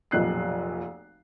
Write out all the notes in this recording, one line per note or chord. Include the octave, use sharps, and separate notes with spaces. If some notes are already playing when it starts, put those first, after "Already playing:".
F1 B1 A#2 F#6 C7